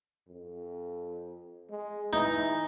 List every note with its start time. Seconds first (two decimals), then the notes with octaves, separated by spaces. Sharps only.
0.28 F2
1.70 G#3
2.13 E3 D#4